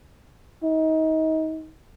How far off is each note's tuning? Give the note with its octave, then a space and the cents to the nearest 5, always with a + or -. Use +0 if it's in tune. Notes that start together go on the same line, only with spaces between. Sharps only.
D#4 +30